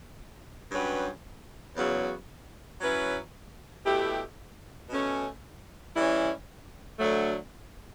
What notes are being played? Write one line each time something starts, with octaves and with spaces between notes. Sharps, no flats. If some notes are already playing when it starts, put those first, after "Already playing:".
G2 F#3 C#4 G4 B4
E2 C#3 F#3 B3 F#4
F#3 C#4 E4 B4
B2 A3 E4 G4
B2 A3 C#4
E3 G3 C#4 E4
D2 D3 F#3 A3